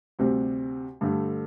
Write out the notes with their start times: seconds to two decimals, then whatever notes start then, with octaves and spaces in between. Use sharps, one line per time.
0.19 D2 C3 G3 C4
1.01 G2 D3 A3